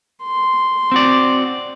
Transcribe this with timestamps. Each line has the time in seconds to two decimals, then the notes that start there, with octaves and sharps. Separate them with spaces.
0.24 C6
0.92 C4 F#4 D5